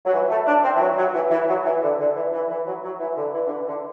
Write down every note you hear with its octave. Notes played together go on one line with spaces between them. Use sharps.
F#3
E3
A3
D4
C4
E3
F#3
F#3
E3
E3
F#3
E3
D3
D3
E3
E3
E3
F#3
F#3
E3
D3
E3
D3
E3
D3